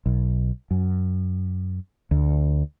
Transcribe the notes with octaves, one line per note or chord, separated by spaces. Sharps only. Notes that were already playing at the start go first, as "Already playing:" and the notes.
B1
F#2
D2